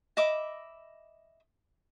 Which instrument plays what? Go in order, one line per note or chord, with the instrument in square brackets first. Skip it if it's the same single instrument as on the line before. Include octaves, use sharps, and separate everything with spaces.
[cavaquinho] D#5 E5 B5 D6